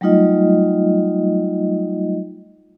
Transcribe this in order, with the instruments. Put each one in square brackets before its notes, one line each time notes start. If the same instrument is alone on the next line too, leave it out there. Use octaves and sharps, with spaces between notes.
[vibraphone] F#3 G3 A3 D#4 F4 D#5